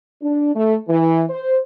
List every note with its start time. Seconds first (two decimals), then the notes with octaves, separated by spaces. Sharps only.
0.22 D4
0.56 A3
0.88 E3
1.30 C5